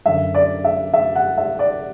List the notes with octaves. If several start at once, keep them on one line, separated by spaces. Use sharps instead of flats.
F#2 D3 E5
D5
E5
E5
F#5
E5
D5